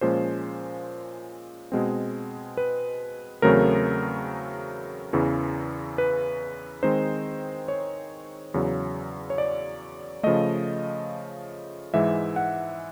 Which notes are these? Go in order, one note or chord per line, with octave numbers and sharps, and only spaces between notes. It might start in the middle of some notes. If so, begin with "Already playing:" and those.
A#2 F3 G#3 C#4 C5
B2 G#3 C4
B4
E2 C#3 F#3 A3 C4 A#4
E2 C#3 E3
B4
D#3 G#3 C4 D#4 C5
C#5
E2 C#3 F#3
C#5
D5
C#3 F3 A3 D#5
G#2 E3 G#3 E5
F#5